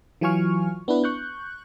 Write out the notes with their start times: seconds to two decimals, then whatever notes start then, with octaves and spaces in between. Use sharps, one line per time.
0.21 E3 F#3 F4 G#5 C#6 F6
0.88 B3 D4 E4 B4
1.04 C#6 F#6 G6